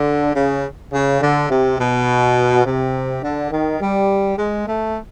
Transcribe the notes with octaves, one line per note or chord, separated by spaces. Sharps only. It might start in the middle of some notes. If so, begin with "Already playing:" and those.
Already playing: D3
C#3
C#3
D3
C3
B2
C3
D3
D#3
G3
G#3
A3